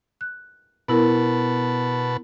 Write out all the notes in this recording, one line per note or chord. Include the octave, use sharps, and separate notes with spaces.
F#6
B2 B3 E4 A#4 B4 A5